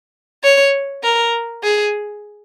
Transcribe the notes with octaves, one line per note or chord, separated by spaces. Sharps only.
C#5
A#4
G#4